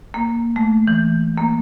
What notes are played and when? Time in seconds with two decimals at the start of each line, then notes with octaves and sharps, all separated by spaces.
0.14 A#3
0.56 A3
0.87 E3
1.38 A#3